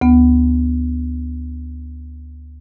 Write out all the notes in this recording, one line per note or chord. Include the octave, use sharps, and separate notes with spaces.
D2 B3